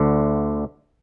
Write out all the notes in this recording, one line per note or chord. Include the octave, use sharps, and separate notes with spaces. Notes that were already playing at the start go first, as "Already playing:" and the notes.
Already playing: D2 D3